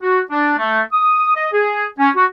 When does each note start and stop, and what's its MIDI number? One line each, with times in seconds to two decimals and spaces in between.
0.03 0.20 66
0.30 0.54 62
0.58 0.81 57
0.93 1.35 87
1.35 1.47 75
1.53 1.85 68
1.99 2.10 61
2.16 2.26 66